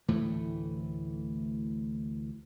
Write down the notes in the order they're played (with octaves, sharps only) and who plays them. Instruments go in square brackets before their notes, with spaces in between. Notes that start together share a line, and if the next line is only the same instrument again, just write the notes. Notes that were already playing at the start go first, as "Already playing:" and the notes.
[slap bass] D2 A2 E3 A3